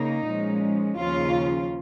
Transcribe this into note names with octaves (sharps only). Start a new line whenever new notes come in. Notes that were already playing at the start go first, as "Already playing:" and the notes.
Already playing: C#3 A#3 D#4
A#2 F3 G#3 C#4
D#2 C#3 F3 C#4 F4